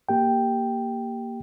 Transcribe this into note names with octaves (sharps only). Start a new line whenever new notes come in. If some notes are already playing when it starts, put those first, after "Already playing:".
A#3 G4 G5